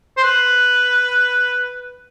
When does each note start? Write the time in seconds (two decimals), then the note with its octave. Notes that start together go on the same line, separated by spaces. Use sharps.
0.17 C5
0.23 B4